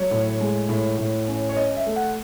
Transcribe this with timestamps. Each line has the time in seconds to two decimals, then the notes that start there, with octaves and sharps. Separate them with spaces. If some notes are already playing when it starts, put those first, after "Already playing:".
Already playing: F#3 C#5
0.11 A2
0.41 G#3
0.69 A2
0.98 A2
1.28 C#4
1.49 C#5
1.56 C#4 D#5
1.77 E5
1.86 A3
1.96 F#5